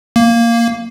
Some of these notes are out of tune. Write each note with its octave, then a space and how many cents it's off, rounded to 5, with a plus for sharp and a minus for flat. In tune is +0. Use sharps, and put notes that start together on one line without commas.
A#3 -5